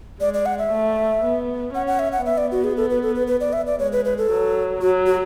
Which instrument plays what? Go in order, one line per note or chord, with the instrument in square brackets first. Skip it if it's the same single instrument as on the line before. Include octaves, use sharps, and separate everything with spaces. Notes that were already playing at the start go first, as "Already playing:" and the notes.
[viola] G#3 [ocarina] D5
[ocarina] D5
F#5
E5
[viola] A3
B3
[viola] C#4 [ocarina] F#5
[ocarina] F#5
E5
F#5
[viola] B3 [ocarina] E5
[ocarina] D5
F#4
G#4
A4
B4
A4
B4
B4
D5
E5
D5
[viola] G#3 [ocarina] C#5
[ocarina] B4
B4
A4
[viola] F#3
[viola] F#3 [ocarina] F#4
[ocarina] F#4